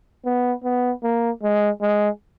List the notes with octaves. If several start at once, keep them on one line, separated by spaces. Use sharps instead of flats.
B3
B3
A#3
G#3
G#3